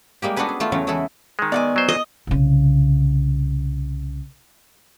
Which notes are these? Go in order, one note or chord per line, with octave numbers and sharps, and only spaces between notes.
G3 G#3 A#3 G4
B3 D4 F#4 A4 B4 G#5
G#4
A3 E4 F4
E2 C#3 F#3 A3 C#4
E3 G#3 E4 A4 B4
D#3 G#3
B3 D5 D#5 F#5 G#5
F#3 C5
D#5
C2 C#3